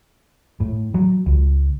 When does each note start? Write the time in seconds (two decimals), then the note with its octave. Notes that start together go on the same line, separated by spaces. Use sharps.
0.60 A2
0.94 F#3
1.26 C#2